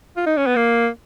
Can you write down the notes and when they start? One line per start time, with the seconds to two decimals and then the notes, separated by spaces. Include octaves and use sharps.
0.17 F4
0.26 D#4
0.37 C#4
0.46 B3
0.56 A#3